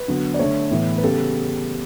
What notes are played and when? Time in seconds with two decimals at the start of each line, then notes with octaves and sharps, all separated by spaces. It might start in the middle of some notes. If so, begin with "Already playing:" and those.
Already playing: B4
0.08 D3 F#3 B3
0.34 D5
0.39 D3 A3 C#5
0.71 A2 E3 B3
0.98 B4
1.03 C#3 G3 B3 A4